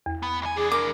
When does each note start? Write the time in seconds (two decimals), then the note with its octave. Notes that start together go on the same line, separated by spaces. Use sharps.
0.06 E2
0.23 B3
0.42 B1 G#5
0.57 E3 D4 G#4
0.71 A#4 D6